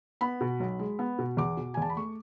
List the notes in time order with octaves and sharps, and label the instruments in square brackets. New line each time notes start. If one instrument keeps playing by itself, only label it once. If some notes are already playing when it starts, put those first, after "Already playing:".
[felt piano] B3 B5
B2
B1
G#3
B3
B2
E2 D6
B2
G#5
E2 A5
B5
A3 C#6